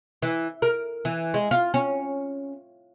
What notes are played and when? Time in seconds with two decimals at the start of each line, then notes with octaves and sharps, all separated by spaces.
0.22 E3
0.62 A#4
1.05 E3
1.34 G#3
1.51 F4
1.74 C#4